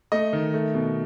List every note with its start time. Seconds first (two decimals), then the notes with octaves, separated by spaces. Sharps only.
0.12 A3 D#5
0.33 D#3
0.54 A3
0.74 B2